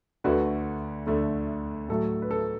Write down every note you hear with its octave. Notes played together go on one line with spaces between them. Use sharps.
D2 D3 A3 F#4 B4
D2 D3 A3
A2 F#3 A3 A4
B4
A4